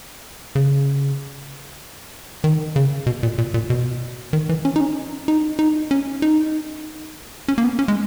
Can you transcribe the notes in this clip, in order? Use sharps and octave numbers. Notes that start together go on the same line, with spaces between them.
C#3
D#3
C#3
B2
A#2
A#2
A#2
B2
D#3
E3
C#4
D#4
C#4
D#4
D#4
C#4
D#4
C#4
A#3
B3
C#4
G#3